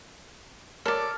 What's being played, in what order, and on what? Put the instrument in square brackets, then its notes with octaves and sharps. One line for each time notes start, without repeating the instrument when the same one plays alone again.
[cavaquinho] A4 D5 [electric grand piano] A#4 C#5 F6